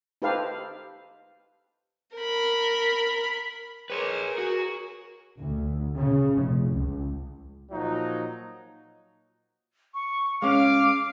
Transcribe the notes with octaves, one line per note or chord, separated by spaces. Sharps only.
D#4 G4 A4 B4 C5 F5
A#4 B5
G#4 A#4 B4 C#5
F#4
D2
C#3
F1
C#2
A#2 F3 F#3 D#4
C#6
G#3 C#4 F5 D6